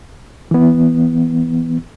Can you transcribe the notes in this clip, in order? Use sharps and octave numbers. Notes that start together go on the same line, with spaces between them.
E3 B3